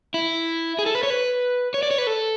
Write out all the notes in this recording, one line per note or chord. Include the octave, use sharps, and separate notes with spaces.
E4
G#4
A4
B4
C#5
B4
C#5
D5
C#5
B4
A4